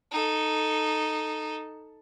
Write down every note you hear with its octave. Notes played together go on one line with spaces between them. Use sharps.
D#4 A4